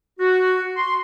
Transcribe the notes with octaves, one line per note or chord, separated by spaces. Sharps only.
F#4
C6